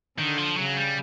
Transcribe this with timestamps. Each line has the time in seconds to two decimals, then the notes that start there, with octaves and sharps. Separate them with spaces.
0.18 D3 D#3
0.38 F3
0.57 C#3 F#3
0.77 G3